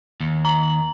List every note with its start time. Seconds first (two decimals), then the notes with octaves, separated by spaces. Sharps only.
0.20 D#2
0.45 A#5 F#7